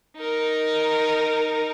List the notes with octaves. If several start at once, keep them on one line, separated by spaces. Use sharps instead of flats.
D#4 A#4